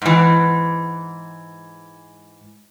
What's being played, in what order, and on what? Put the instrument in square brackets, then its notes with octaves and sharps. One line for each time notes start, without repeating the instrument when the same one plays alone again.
[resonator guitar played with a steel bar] G#2 E3